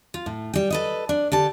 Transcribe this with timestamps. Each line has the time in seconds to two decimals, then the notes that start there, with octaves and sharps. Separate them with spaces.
0.14 F4
0.26 A2
0.54 G3 G5
0.70 A4 B4 D#5
1.09 D4
1.32 D3 G4 A5